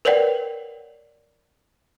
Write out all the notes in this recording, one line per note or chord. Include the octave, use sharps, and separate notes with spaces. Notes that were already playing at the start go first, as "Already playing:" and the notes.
A#4 B4 C#5 D5 F#5 G5